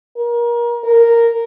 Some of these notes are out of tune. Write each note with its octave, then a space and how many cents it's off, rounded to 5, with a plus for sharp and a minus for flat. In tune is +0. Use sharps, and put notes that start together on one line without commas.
A#4 +30
A#4 -5